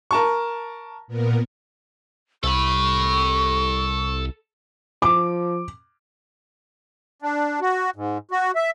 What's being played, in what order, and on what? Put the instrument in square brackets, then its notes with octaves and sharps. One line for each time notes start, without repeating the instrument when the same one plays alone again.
[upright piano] A#4 A5 C#6
[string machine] A#2 B3 A#4
[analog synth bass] C2 [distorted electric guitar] A4 B5 [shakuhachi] C#6
[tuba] F3 [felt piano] D6
[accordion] D4
F#4
G#2
F#4
E5